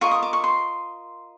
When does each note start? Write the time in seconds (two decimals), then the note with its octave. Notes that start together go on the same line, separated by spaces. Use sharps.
0.01 F4 A#4 D#5 C#6
0.11 D#6
0.23 D6
0.33 C#6
0.44 C6